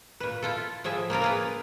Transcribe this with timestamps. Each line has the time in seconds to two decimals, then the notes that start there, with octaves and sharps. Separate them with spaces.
0.20 A#2 B4
0.42 E4 F4 A4
0.84 A2 F3 G#4 E5
1.10 A#3 E4 F4 A#4
1.22 A#3 G#4 B4